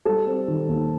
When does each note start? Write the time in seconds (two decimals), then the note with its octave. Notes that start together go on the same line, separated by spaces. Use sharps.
0.05 G3 A4
0.26 C4
0.48 D#3
0.69 D#2